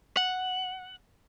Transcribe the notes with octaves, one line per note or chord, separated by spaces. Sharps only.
F#5